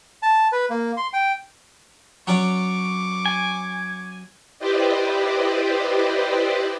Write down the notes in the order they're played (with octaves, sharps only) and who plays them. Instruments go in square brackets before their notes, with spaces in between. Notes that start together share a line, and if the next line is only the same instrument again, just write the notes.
[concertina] A5
B4
A#3
C6
G5
[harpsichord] F#3 C#4 D5 [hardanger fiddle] C#6 D6
[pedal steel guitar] G#5
[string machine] E4 G4 B4 C5 D5 D#5